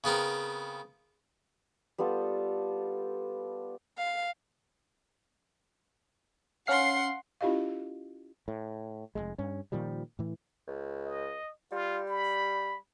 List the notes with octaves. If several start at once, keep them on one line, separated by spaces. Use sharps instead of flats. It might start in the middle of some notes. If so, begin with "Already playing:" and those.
C#3 B3 C4 A#4
G3 B3 F4 A4
F5
C#4 F5 F#5 C6 C7
C#4 E4 F4 G4 D#5 F5
A2
F1 D#2 G#3
G2 C#4
A#2 D#3 F3 G3
A2 E3
C#2
D#5
G3 F4
B5